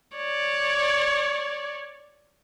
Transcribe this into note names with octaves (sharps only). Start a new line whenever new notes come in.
C#5 D5